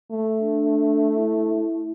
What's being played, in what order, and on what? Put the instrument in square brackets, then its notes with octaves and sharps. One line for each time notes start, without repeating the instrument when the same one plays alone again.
[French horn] A3
[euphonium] D4
E4